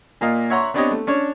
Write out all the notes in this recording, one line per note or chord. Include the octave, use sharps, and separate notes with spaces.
A#2 A#3 F4 D#5 F5
C#5 E5 F#5 A#5 C6 C#6
B3 C4 D4 G4 C#5 D#5
A3
C#4 D4 C#5